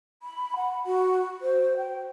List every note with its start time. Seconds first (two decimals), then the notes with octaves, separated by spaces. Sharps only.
0.23 B5
0.56 F#5
0.86 F#4
1.42 C5
1.77 G5